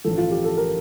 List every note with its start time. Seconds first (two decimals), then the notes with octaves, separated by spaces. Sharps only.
0.05 A1 G2 D3 F3 A4
0.18 F4
0.31 G4
0.44 A4
0.57 A#4